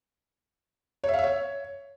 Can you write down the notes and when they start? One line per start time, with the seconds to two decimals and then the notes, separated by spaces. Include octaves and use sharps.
1.04 C#5
1.09 E5
1.14 F5
1.19 E5
1.24 C#5